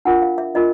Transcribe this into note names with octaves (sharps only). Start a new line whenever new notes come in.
D4 F4 A#4 F#5
F5
E5
D4 F4 A#4 D#5